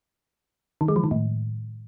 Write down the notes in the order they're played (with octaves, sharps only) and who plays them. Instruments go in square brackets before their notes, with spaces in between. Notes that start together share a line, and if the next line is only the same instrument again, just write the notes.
[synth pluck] D#3
G#3
F3
D#3
A2